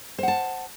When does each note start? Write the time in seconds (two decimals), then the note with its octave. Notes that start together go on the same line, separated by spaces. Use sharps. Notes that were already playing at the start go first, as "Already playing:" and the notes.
0.19 C5
0.23 F#5
0.28 A5